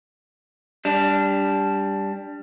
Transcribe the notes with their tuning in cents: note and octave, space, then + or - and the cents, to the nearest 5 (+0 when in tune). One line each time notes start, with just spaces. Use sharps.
G3 +10 D4 -15